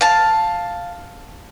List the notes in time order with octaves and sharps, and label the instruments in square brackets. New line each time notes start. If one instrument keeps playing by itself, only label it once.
[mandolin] F5 A5